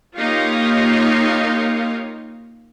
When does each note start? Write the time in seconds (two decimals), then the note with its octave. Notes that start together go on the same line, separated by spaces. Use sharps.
0.18 A#3 D#4 F4 G4 C#5 F5